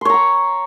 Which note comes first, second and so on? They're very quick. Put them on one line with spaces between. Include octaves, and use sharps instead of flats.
C6 C#5 A#5 F#5